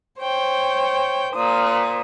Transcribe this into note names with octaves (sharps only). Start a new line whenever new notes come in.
C5 C#5 G5
A#2 C5 D#6